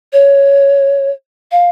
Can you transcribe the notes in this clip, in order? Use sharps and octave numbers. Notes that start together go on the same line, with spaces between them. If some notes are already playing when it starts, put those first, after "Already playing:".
C#5
F5